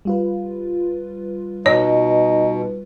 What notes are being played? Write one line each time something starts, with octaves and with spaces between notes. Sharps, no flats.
G3 F4 B4
B2 D#4 C#5